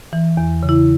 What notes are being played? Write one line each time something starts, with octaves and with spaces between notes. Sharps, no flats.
E3
E2
C#3
E4